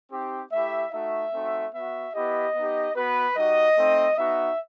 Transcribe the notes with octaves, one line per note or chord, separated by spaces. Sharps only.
C4 D#4 G4
A3 E4 G4 E5
A3 D#4 F#4 E5
A3 C4 D#4 F#4
B3 F#4 E5
B3 E4 G4 D#5
B3 D#4 G4
B3 F#4 B4
G3 D#4 F#4 D#5
A3 C4 D#4
B3 D#4 F#4 E5